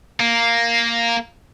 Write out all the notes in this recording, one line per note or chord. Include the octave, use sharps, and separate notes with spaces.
A#3